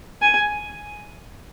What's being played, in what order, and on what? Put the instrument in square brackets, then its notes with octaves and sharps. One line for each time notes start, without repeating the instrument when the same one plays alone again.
[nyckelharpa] G#5